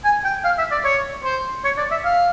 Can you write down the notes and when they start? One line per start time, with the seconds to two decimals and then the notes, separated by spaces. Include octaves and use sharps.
0.04 G#5
0.25 G5
0.44 F5
0.58 E5
0.71 D5
0.85 C#5
1.24 C5
1.65 C#5
1.78 D5
1.91 E5
2.04 F5